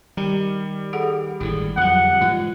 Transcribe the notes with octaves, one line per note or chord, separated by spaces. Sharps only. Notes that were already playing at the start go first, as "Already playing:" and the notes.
D#3 G3 A#5
G#4 A4 F#5
G#1 A2 D3 E4 G#4
F2 D3 F3 F#3 F4 F#5
G#2 E3 G#3 F4